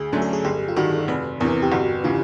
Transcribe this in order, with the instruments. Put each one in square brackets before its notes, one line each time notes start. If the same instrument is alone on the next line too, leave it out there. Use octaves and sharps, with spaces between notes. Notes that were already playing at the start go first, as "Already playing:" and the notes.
Already playing: [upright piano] D2 [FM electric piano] G#4
[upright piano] D3 F#3 A3 C#4
[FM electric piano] A4
G#4
[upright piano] G1 [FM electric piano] G4
[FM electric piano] F4
[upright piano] G2 D#3 [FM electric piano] F#4
[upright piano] F1 [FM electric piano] B4
[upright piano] E2 C3 E3 [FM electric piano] A#4
[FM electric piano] G4
[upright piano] G1 [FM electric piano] F#4
[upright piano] C#3 E3 [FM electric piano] F4